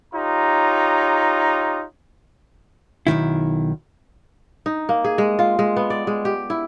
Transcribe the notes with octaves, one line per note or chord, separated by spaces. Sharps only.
D#4 F4 G4 C#5 A#5
B1 F2 D#3 E4
D#4
A#3
G#4
G#3
F4
G#3
B3
D5
G#3
G4
E4